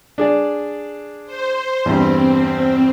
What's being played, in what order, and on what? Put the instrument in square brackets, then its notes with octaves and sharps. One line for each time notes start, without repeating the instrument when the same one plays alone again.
[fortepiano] D4 G#4 D5
[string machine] C5
[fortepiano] E2 G2 [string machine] C4